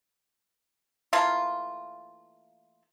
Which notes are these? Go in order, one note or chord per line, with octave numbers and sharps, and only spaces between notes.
E3 A3 A#3 F4